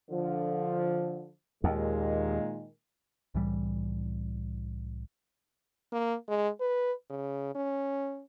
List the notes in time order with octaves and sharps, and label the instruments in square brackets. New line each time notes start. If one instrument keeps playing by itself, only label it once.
[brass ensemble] D3 F3
[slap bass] D#2 [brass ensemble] A#2 D#3 G#3
[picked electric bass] C2 A2 E3 G3
[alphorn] A#3
G#3
B4
C#3
C#4